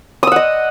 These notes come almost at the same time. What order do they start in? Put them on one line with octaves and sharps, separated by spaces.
D#6 E6 F#5 D#5